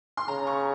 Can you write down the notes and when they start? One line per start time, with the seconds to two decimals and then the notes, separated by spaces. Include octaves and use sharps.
0.17 C6
0.28 C#3 A#5
0.47 C#6